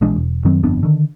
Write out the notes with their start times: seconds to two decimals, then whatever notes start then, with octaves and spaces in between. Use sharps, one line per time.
0.01 A#1 E3 G#3 D4
0.16 E1
0.45 F#2 D#3 F#3 C4
0.63 G1 F2 B3 D4
0.83 D3 D#3